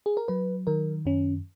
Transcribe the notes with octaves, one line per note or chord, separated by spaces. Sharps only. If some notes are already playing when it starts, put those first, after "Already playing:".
G#4
A#4
F#3 B4
D#3 A#4
F#2 C#4